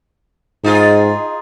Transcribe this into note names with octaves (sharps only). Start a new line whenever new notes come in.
G#2 D#4 F4 G#4